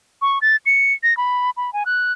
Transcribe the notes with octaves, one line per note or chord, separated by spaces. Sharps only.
C#6
A6
C#7
A#6
B5
B5
G#5
F#6